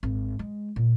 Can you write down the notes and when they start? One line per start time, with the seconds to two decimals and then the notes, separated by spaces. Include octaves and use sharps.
0.03 G#1
0.39 G#3
0.76 A#2